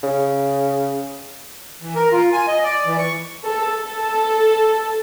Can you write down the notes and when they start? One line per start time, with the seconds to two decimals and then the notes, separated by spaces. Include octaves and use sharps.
0.03 C#3
1.82 E3
1.95 A#4
2.12 F4
2.33 G#5
2.48 D#5
2.64 D5
2.86 E3
2.98 C#6
3.44 A4
3.78 A4